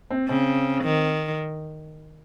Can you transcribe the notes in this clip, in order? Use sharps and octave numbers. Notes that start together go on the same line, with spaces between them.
C4
C#3 C4
D#3